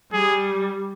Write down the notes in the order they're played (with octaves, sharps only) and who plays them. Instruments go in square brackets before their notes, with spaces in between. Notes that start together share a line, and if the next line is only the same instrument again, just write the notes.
[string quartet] G3 [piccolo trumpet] G#4